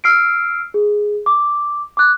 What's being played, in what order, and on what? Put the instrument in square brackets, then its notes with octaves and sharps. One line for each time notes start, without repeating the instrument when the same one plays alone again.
[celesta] E6 F6 C7 D7
G#4
D6
D6 F#6